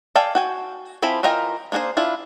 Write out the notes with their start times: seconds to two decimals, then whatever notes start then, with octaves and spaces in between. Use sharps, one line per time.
0.16 A4 D5 F5 G5 G#5
0.35 F#4 G5 G#5
1.02 F3 C4 E4 G#5 B5
1.23 E3 F4 A#4 D#5 G5
1.72 A#3 D4 G#4 A#4 C5
1.97 D4 E4 F4